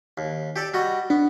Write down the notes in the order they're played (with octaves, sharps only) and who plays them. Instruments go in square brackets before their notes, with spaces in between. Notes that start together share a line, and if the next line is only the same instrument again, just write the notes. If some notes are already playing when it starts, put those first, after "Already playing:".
[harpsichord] D#2
G4 A4 D5
G3 F#4 D#5
[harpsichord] B3 [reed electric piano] D4